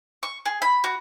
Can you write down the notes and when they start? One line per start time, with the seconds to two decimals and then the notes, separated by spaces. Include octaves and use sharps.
0.23 C#6
0.46 G#4
0.62 B5
0.84 F#4